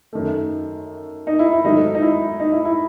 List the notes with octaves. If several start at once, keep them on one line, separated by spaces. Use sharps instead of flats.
F#2 D#3 A3
D#4
E4
E4
G#2 D#3 F#3 A3 D#4
D#4
E4
D#4
E4
E4